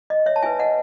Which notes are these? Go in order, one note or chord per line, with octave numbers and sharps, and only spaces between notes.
D#5
C#5 E5
A5
E4 B4 E5 G#5
D#5 F#5